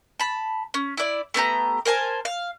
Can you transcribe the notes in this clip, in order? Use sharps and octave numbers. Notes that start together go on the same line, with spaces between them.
A5 B5
C#4
E4 D5
A3 B3 G4 A#5
A#4 C5 G#5 A5
F5